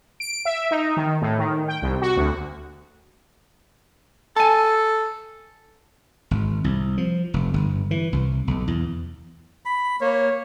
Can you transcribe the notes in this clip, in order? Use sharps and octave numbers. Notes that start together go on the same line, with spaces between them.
D7
E5
D#4
D#3
A2
D#3
G5
C2
F#4
D2
A4 G#5 A5
G#1
C2
F3
F1
G1
E3
C2
B1
E2
B5
A#3 C#5